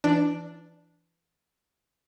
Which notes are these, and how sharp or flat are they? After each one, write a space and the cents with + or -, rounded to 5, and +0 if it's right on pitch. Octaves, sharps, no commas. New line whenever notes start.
E3 +25 D4 +0